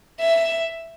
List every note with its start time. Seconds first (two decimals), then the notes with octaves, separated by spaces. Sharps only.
0.20 E5